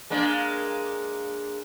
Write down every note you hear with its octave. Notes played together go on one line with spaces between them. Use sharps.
G#3 A#3 D4